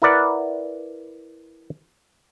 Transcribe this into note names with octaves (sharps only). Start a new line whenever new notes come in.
E4 A#4 B4 D5 F#5